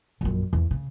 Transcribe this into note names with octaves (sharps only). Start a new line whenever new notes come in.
A#1 F#2
E2
C#3